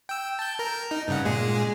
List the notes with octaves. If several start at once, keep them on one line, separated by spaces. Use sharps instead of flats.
G5 E6
A5 G6
A#4 A#5
D#4
G2 C#3 F#5
A#2 G#3 G#4